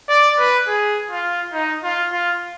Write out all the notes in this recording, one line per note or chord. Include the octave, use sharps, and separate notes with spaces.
D5
B4
G#4
F4
D#4
F4
F4